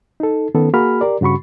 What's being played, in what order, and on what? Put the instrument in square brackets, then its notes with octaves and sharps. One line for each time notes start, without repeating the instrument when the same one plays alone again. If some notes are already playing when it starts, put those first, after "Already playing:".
[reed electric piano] D#4 A4
D#3 B3 C#4 A4
A#3 F#4 G#4 B5 F6
G4 A#4 D5
G2 C#3 F#4 B5 C#6